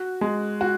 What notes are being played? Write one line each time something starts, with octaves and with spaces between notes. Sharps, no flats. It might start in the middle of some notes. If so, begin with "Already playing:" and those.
Already playing: F#4
G#3
F#4